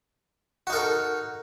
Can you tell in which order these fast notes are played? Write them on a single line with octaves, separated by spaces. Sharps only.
F#4 D#4 A#4 A4